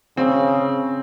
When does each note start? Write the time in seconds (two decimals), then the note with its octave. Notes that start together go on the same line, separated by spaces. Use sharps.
0.17 C#3 C4